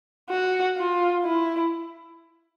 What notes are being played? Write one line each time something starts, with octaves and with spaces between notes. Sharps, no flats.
F#4
F4
E4